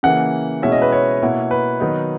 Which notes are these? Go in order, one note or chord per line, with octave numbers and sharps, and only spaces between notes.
C#3 E3 A#3 F#5
B2 G#3 C#4 E4 E5
D#5
B4
C#5
B2 A#3 E4
B4
D#3 F#3 B3 D#4